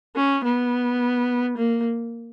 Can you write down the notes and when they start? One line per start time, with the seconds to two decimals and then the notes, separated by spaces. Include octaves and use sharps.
0.16 C#4
0.44 B3
1.58 A#3